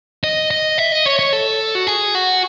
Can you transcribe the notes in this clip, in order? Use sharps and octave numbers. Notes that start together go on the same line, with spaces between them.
D#5
D#5
E5
D#5
C#5
C#5
A4
F#4
G#4
F#4